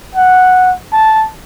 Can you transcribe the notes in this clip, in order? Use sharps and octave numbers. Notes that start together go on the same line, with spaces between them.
F#5
A5